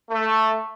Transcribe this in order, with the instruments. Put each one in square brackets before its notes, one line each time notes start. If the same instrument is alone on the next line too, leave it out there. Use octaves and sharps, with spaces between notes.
[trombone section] A3